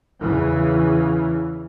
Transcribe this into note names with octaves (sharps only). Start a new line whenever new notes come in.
E2 C#3 E3